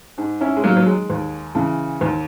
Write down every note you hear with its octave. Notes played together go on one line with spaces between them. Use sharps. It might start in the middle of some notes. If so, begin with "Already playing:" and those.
G#2
C#4 E4
G#3
D#3 F#3 A#3
F#3
G#3
D#2
C#3 E3
D#2